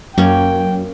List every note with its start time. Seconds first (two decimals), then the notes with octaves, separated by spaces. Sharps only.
0.18 F#2 A#3 C#4 G5